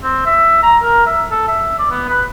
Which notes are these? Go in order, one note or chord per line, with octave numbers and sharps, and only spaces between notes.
C4
E5
A#5
A#4
E5
A4
E5
D5
B3
B4